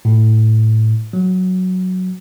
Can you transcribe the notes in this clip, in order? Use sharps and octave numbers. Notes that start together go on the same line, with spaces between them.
A2
F#3